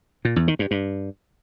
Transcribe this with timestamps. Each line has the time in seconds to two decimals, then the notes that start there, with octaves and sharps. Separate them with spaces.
0.25 A#2
0.36 E2
0.48 D#3
0.59 G2
0.71 G2